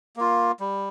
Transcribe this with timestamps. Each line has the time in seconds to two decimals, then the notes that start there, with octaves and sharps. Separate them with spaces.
0.16 A#3 F4
0.60 G3